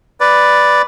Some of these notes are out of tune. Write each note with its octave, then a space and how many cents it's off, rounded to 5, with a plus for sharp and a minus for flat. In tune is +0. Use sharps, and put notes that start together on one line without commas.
B4 +0 D5 +0